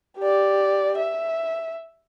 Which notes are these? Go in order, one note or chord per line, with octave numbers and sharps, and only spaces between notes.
G4 D5
E5